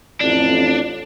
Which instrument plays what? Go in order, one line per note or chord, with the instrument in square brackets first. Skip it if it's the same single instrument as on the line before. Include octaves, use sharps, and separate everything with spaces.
[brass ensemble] A1 F2 [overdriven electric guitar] D4